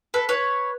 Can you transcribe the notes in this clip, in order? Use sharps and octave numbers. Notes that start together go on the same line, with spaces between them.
A4 B4
B4 C#5